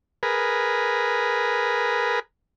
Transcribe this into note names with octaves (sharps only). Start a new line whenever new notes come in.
G#4 A#4 B4